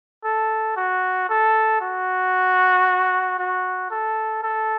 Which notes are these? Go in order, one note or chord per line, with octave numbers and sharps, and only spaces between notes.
A4
F#4
A4
F#4
F#4
A4
A4